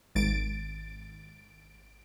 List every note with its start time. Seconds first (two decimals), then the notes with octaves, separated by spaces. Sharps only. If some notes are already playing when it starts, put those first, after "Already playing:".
0.15 G#1 A6 D7